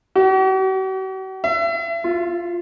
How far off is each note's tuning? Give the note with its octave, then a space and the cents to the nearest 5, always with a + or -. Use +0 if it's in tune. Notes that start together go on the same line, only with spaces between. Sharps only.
F#4 +45
E5 +35
F4 -5